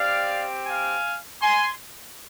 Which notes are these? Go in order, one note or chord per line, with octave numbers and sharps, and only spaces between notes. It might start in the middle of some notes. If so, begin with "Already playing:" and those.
Already playing: C4 G4 D5 F5
F5 G#5
G#5 C6